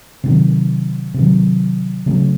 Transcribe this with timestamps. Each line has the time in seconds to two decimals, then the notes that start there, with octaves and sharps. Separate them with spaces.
0.24 C3 D#3 F#3
1.14 C3 D#3 F#3
2.06 C#3 F#3 A3